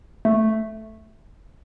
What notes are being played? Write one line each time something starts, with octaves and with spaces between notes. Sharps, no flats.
A3